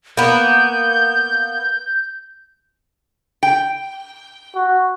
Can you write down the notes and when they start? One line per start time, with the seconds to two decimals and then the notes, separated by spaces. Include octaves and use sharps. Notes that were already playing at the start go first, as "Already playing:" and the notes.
0.17 A#3 B3 G6
3.43 G5
4.55 F#4